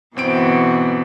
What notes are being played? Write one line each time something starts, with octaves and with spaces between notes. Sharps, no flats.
G1 B2 E3 C4 F#4 D7